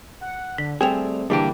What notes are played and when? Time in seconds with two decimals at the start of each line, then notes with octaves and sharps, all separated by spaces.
0.21 F#5
0.58 D3 B6
0.81 G3 A3 C4 G#4 G5 E7 F7
1.30 D3 E3 G3 A#3 D4 G4 G#4 G5